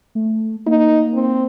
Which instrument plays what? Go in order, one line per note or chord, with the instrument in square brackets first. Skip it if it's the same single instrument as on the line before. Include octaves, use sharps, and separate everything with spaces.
[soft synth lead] A3
[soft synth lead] A#3 [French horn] D#4
[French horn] C4